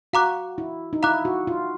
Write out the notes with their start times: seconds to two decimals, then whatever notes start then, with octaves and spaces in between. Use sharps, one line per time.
0.13 F#4 F5 A#5 D6 F#6
0.58 E4
0.93 D#4
1.03 E4 F5 A#5 D6 F#6
1.25 F#4
1.47 F4